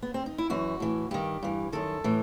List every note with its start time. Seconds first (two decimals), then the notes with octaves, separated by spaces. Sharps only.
0.02 B3
0.14 C4
0.26 D#4
0.38 E4
0.50 F#2 E3 F#4
0.80 A2 E3
1.11 G2 D#3 G4
1.43 G2 E3
1.73 F#2 D#3 A4
2.04 A2 E3